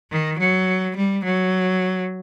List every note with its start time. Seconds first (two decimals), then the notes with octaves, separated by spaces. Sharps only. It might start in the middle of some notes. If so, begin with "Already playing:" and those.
0.11 D#3
0.39 F#3
0.96 G3
1.24 F#3